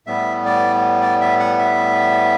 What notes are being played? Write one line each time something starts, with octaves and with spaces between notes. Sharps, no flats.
A2 G3 B3 E5
D5
D5
E5
F#5
E5